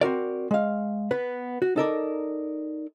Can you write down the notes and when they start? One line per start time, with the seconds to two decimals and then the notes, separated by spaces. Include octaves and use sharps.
0.01 C4 F#4 A#4 D5
0.51 G#3 F5
1.11 B3 B4
1.62 F#4
1.76 D#4 A4 A#4 D5